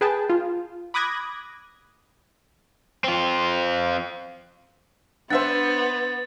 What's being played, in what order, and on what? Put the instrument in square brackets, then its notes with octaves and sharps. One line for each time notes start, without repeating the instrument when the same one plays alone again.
[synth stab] G#4 B4 G5 A5
F4
B5 D6 D#6 F#6 G#6 A#6
[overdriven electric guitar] C4 F4
[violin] B3 [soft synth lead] D4 [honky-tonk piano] C5 E5 F#5 [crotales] A6